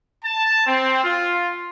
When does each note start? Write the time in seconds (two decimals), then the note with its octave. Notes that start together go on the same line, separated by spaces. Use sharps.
0.24 A5
0.66 C4
1.03 F4